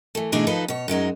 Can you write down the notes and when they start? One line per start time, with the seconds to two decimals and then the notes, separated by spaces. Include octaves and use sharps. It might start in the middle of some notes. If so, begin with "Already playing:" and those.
0.15 E3 A3
0.32 B2 E3 A3 D4 D#4 G#4
0.47 D#2 F3 D#4 A4 B4 D#5
0.68 B2 C#5
0.88 F#2 F#3 G#3 D#4